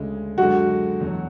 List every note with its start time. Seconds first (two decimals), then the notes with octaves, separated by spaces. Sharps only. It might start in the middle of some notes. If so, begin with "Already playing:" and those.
Already playing: D2 C#3 G#3
0.38 F#2 D3 G#3 F#4
1.01 E2 B2 F#3